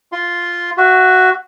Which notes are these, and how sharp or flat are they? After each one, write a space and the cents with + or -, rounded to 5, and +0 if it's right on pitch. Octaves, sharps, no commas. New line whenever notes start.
F4 +0 C6 +0
F#4 +5 E5 +35